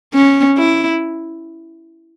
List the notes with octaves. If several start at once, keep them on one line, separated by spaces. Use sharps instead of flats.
C#4
E4